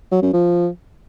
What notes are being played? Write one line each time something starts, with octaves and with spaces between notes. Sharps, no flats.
F#3
F#2
F3